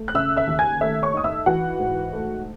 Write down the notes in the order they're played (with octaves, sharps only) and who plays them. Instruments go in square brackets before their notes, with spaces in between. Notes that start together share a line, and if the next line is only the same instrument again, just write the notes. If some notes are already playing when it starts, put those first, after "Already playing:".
Already playing: [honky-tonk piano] A3
F#6
C#3 E5 E6
E5 E6
D#2
G#5 G#6
A3 E5 E6
C#5 C#6
D#4 D#6
E5 E6
E3 F#4 F#5
G#2
A3